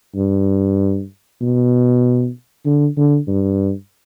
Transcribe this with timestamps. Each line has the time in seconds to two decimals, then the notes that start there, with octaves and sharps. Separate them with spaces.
0.16 G2
1.41 B2
2.66 D3
2.97 D3
3.28 G2